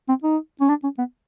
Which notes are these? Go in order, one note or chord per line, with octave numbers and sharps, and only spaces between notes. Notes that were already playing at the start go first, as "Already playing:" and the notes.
C4
D#4
C#4
D4
C#4
B3